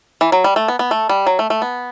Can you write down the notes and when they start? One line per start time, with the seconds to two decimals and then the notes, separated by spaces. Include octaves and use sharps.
0.21 E3
0.32 F#3
0.44 G3
0.56 A3
0.68 B3
0.79 B3
0.91 A3
1.09 G3
1.27 F#3
1.39 A3
1.50 A3
1.62 B3